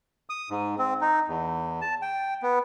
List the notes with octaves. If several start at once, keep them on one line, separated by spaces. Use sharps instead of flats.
D#6
G#2
C4
D#4
E2
A5
G5
B3